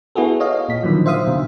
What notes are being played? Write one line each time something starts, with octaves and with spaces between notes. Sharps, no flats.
B3 E4 F#4 G#4 A4
C#5 D#5 F5
A#2 B6
D3 D#3 F3 F#3
C5 E5 F5 D#6
B2 D3